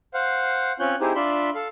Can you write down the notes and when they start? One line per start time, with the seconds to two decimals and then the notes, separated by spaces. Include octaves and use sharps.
0.14 C5 F5 F#5
0.80 C4 C#4 F4 C#5 F#6 G6
1.01 C4 D#4 E4 G4 G#4 C5
1.15 D4 F4 D5 E5 B5 C6
1.55 A4 F5